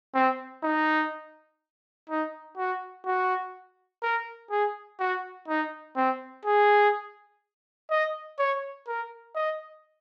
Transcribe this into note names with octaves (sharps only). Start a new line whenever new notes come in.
C4
D#4
D#4
F#4
F#4
A#4
G#4
F#4
D#4
C4
G#4
D#5
C#5
A#4
D#5